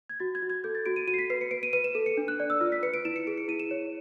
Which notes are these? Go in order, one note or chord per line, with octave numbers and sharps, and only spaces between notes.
G#6
F#4 A6
G#6
F#4
G#6
A4 G6
A6
F#4 D7
D#7
F#4 D#7
C7
B6
B4 C7
C#7
B4 D7
D#7
B4 D#7
E7
A4 D#7
C#7
D4
F#6
D5
E6
F4 F6
B6
B4 C#7
D7
E4 E7
C#7
G#4 D7
C#7
E4 D#7
E7
C#5